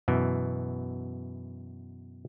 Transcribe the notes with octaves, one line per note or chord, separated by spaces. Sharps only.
F#2 B2 E3